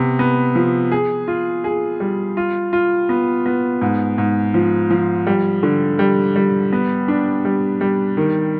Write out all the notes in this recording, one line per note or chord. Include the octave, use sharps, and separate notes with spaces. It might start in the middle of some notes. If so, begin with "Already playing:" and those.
Already playing: C3 B3
B3
F3
G#4
F4
G#4
G3
F4
F4
B3
B3
G#2
G#2
F3
F3
G3
D3
G3
G3
B3
D4
G3
G3
D#3